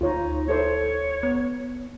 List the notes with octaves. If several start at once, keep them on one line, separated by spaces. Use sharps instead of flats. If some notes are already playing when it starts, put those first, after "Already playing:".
D2 D#4 F4 C#5
E4 A4 C5 C#5
B3